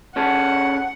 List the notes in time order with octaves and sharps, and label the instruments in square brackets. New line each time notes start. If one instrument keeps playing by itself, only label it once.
[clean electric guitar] C#4 G#4 A4 [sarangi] F#5